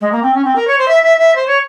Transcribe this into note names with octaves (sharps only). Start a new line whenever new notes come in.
G#3
A#3
C4
C#4
C4
A#4
C#5
C5
E5
E5
E5
C5
C#5